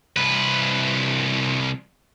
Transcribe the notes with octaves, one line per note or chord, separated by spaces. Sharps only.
C2 B4